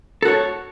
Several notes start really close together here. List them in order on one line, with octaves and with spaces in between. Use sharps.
A4 F#4 C#5